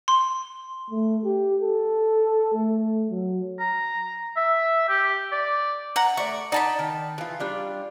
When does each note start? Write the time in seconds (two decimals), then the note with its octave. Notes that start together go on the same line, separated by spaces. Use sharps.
0.08 C6
0.91 A3
1.25 G4
1.62 A4
2.54 A3
3.10 F#3
3.59 A#5
4.36 E5
4.89 G4
5.32 D5
5.96 F#5 A#5
6.17 A3 D5 C#6
6.52 D#4 D5 F#5 A5 B5
6.79 D#3
7.18 E3 F4
7.40 G3 D4 F4